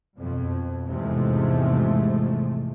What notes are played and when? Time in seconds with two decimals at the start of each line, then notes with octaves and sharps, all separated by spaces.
0.16 F2 B2
0.86 E2 G#2 C3 F3 G#3 A3